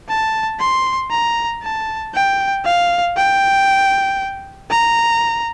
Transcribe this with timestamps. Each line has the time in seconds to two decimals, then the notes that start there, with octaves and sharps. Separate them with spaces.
0.09 A5
0.59 C6
1.11 A#5
1.62 A5
2.14 G5
2.65 F5
3.17 G5
4.70 A#5